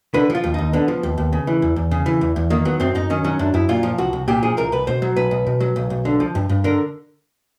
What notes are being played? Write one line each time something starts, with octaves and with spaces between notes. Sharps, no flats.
D3 B4
F3 F4
D#2
D#2 D#4
D3 B3
F3
D#2
D#2
C#3
E3
E2
E2
C#3
E3
E2
E2
D#3 A#3
F#3 B3
F#2 C4
F#2 D#4
D#3 C#4
F#3 C#4
F#2 D4
F#2 E4
A#2 F4
F3
C2 F#4
C2
A#2 G4
F3 G#4
C2 A#4
C2 B4
B2 C5
F#3
B1 B4
B1
B2
F#3
B1
B1
D3
F3
G2
G2
D3 A#4